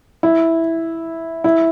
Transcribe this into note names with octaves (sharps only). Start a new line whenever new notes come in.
E4
E4